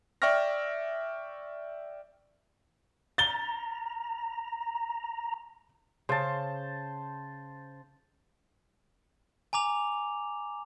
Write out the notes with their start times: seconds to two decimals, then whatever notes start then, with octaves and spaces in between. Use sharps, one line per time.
0.22 D5 E5 G5 C#6 F6 A#6
3.18 A#5 A6 G7
6.09 C#3 C5 A5
9.53 G#5 A#5 D6 F7